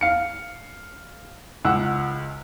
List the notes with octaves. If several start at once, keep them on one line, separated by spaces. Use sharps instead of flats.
F5 C#7
C#2 F#5 E6